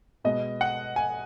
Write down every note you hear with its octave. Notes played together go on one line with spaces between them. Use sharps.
B2 G#3 B3 D#5
F#5
G#5